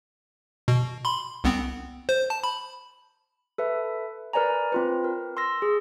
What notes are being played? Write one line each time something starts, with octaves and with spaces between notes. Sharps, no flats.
B2
B5 C6
C2 B3 C4
C5
A5
B5
A4 B4 E5
A#4 B4 D5 G#5 A#5
C4 F4 B4
A#4
C6 E6 A#6
G#4